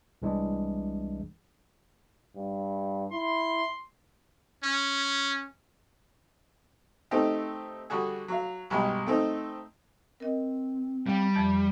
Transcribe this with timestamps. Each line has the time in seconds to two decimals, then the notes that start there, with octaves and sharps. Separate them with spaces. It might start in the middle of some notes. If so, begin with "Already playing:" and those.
0.22 C2 C3 E3 G#3 D4
2.36 G2
3.12 E4 C6
4.63 C#4
7.11 A3 C4 D#4 G4
7.90 D3 G3 F#4 G#4
8.28 F#3 F5
8.70 B1 G2 G#3 G4 B5
9.06 A3 C4 D#4
10.20 C4 A#4 D#5
11.07 G3 F5 G5
11.36 F2 E3 F3